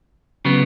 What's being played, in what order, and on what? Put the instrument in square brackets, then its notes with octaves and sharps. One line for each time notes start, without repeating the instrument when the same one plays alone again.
[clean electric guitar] C#3 F#3 B3